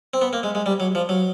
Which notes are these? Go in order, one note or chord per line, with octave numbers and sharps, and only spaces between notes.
C4
B3
A#3
G#3
G#3
G3
F#3
F3
F#3